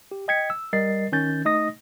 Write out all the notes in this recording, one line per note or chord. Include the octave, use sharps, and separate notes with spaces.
G4
D#5 G5 G#6 B6 C#7
E6
G3 A#4 D#5 A6 C7
D#3 C#4 G6 A6
A3 D#4 D#5 D#6 A#6